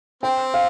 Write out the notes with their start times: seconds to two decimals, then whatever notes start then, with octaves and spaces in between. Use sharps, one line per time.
0.23 C4 G5
0.54 F5